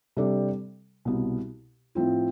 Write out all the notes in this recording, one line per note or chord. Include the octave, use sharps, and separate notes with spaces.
C3 G3 D4 A4 D5
C2 B2 B3
A2 F3 C4 F4